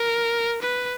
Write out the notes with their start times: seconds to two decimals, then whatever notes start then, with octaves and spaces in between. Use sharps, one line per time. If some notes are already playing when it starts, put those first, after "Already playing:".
Already playing: A#4
0.62 B4